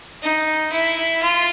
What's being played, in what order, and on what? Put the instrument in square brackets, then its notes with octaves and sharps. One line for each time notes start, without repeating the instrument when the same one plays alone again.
[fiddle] D#4
E4
F4